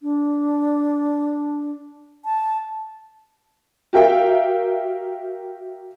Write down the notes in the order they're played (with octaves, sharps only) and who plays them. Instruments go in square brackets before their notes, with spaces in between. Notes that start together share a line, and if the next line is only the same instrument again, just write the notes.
[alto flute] D4
A5
[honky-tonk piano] F#4 G4 A#4 E5 F5 G5